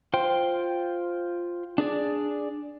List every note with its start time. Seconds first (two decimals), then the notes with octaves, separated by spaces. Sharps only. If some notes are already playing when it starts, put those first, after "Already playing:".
0.14 F4 C5 G5 C6
1.78 D4 G#4 D5